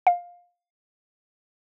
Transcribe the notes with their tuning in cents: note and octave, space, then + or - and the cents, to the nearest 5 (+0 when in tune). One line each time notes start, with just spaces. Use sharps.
F5 +15